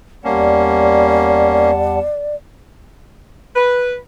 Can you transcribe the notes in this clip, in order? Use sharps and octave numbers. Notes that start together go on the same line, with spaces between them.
E2 G3 A#3 C#4 D5 F#5 A5
B4